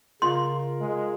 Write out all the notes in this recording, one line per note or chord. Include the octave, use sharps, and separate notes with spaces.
C#3 F4 A#4 C6
G#3